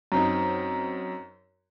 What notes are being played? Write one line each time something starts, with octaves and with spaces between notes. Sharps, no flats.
F#2 C4 D#4